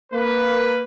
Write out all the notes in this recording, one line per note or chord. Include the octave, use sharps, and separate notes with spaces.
A#3 B4